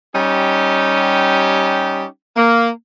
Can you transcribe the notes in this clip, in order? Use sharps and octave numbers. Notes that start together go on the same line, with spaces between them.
G3 C#4 D#4 G4
A#3